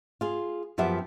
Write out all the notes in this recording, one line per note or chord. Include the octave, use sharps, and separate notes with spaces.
F4 G#4
F#2 F3 B3 G4 E5